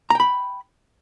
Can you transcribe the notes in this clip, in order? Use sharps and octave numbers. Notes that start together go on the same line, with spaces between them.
G5 A#5 B5